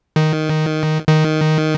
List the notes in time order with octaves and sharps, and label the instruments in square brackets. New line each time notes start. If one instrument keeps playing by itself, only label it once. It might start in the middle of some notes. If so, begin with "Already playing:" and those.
[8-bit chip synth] D#3
D#3